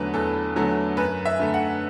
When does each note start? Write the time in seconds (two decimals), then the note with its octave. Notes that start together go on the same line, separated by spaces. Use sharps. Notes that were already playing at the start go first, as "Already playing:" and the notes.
Already playing: E2 D3 F#3 A3 B4
0.14 E2 A4
0.56 D3 F#3 A3
0.97 F#2 B4
1.25 E5
1.40 D3 A3
1.54 F#5